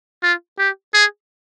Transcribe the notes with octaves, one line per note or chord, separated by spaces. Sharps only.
F4
G4
G#4